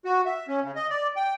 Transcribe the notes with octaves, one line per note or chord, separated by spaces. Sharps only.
F#4
E5
C#4
C#3
D#5
D5
G5